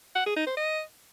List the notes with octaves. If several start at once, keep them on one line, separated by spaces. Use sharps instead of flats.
F#5
G#4
D#4
C5
D#5